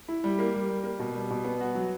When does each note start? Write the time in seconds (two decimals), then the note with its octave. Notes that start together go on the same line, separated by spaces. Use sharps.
0.08 E4
0.24 G3
0.39 A#3
0.54 G3
0.69 G3
0.84 A#3
0.99 B2
1.15 G3
1.30 B2
1.45 B3
1.60 F#4
1.75 F#3